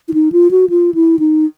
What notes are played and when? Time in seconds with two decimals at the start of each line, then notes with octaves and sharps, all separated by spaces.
0.08 E4
0.14 D#4
0.32 F4
0.51 F#4
0.70 F4
0.94 E4
1.19 D#4